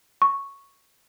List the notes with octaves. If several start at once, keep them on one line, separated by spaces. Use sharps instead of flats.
C#6